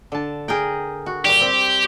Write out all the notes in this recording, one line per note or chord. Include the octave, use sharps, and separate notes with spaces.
D3 A5
G#4 A#4 G5
F#4
A#2 G3 G4
C4